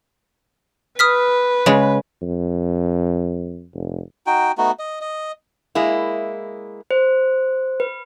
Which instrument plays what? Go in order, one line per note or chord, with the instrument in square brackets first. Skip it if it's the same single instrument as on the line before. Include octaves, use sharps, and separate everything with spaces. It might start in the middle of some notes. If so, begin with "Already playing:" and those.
[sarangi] B4 [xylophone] D#6 F6 B6
[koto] C#3 G#3
[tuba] F2
F1
[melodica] D#4 F#4 G5
A3 B3 D#4 F#4
D#5
D#5
[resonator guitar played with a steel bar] G#3 A#3 E4
[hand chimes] C5
B4